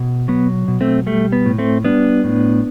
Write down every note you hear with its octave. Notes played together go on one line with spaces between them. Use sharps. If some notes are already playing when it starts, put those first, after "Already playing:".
Already playing: B2
F#3 B3
B2
A3 C4
G3 A3
B3
A2
A3 C4
G3 B3 D4
A2